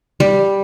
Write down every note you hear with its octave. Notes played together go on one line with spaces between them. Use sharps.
G3